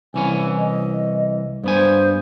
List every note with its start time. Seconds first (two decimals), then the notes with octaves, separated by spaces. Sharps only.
0.14 C2 E3 C#4 G#5
0.58 D#5
1.64 G2 B3 C5 G#5